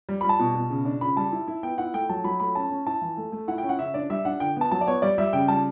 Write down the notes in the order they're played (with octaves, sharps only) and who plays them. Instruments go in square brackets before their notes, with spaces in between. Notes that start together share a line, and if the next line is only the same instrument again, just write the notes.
[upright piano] G3
G3 B5
A5
B2
B2
C#3
D4
C#3 B5
G3 A5
E4
E4
B3 G5
E4 F#5
A3 G5
F#3 A5
F#3 B5
A3 B5
C#4 A5
C#4
E4 A5
E3
A3
A3
E4 F#5
G5
C#4
F#5
C#3 E5
D4 D5
G3 E5
D4 F#5
D3 G5
B3 A5
F#3 A5
D5
B3 C#5
G3 D5
G3 E5
C#3 G5
G3 A5